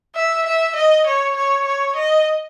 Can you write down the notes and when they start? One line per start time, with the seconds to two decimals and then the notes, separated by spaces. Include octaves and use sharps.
0.15 E5
0.46 E5
0.76 D#5
1.06 C#5
1.36 C#5
1.65 C#5
1.96 D#5